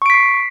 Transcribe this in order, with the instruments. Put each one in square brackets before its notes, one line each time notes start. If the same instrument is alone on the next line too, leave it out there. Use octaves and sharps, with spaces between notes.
[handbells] C#6
D7
B6
C7